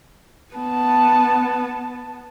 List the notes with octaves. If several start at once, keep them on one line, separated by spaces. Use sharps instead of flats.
B3 A5